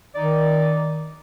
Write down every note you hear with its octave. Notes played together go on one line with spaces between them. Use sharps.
D#3 D#4 D5